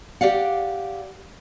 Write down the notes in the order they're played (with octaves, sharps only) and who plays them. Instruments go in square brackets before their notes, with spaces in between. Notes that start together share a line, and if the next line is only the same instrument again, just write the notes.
[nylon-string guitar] G4 D5 F5 F#5